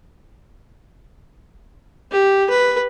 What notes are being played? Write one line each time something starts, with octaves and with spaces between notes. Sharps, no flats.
G4
B4